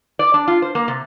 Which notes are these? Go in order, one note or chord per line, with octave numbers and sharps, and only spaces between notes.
D5
D4
F4
C5
A#3
C3